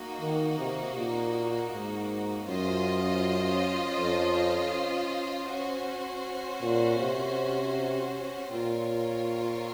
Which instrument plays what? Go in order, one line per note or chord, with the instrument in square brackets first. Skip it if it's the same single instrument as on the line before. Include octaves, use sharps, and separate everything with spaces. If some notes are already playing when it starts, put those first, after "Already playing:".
Already playing: [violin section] A#3 D#4 F#4
[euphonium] D#3
C3
A#2
G#2
[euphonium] F#2 [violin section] C#4 F4 C5 D#5
[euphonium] F2
[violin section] C#4 F#4 C5
[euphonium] A#2
C3
[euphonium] A#2 [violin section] C4 F4 A#4 C#5